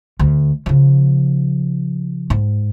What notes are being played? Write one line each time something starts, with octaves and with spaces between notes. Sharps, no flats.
D2
C#3 F3
G#2